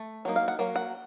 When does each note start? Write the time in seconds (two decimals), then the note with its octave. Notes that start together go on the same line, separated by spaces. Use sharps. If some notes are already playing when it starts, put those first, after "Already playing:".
Already playing: A3
0.25 F#3 A#3 D#4
0.36 F5
0.48 F#5
0.59 F#3 A#3
0.76 F#5